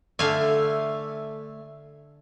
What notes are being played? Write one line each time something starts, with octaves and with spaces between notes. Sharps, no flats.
D3 A3 E5 F5 G#5